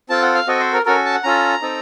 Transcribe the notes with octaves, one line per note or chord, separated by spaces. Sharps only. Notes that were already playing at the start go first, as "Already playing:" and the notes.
C4 F4 A4 A5
F#5
F5
C4 F#4 A4 D#5
C5
A#4
C#4 F#4 A4 A#4
A5
F#5
C#4 F4 A4 A#5
C4 D#4 A4